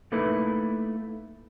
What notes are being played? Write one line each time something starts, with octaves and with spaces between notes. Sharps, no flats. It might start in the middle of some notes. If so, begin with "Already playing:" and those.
A3 A#3 D#4 E4 A4 B4